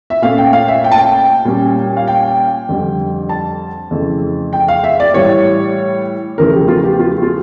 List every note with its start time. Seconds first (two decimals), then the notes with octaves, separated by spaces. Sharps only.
0.10 E5
0.22 A#2 A3 C#4 F5
0.38 G5
0.53 F5
0.68 E5
0.84 G5
0.92 A5
0.98 G5
1.45 A#2 G3 C#4
1.97 F5
2.07 G5
2.69 F2 D3 G3
3.29 A5
3.91 F2 C#3 E3 A3
4.53 G5
4.68 F5
4.84 E5
5.00 D5
5.14 A2 E3 G3 C#5
6.38 E2 C#3 F3 A3 A#4
6.53 G4
6.68 F4
6.84 G4
6.99 F4
7.22 F4